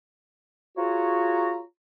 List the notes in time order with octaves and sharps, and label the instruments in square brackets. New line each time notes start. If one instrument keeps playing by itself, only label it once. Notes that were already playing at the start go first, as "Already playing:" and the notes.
[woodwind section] F4 F#4 G#4 C#5 A#5